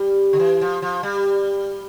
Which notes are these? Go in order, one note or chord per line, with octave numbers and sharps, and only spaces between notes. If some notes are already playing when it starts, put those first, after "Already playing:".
Already playing: G3
D3
E3
F3
F3
G3